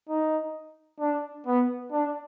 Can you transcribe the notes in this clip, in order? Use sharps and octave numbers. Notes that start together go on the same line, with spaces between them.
D#4
D4
B3
D4